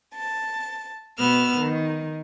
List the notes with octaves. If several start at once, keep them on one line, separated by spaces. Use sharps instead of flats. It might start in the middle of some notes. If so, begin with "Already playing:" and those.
A5
B2 B3 E6 F6
D#3